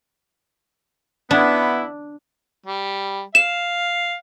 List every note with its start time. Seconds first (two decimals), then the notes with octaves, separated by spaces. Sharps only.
1.31 B3 D4 E4
2.66 G3
3.35 F5 E7